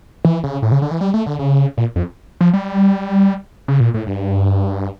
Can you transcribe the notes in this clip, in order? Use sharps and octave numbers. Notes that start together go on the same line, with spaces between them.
E3
C#3
A2
C#3
D3
E3
G3
A3
D3
C#3
A#2
F2
F3
G3
C#3
A#2
A2
G2